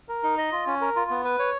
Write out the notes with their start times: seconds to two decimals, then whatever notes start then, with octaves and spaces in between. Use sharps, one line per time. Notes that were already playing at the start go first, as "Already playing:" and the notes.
0.08 A#4
0.23 D#4
0.38 D#5
0.52 F4
0.67 C#4
0.81 A#4
0.96 F4
1.10 B3
1.25 B4
1.39 C#5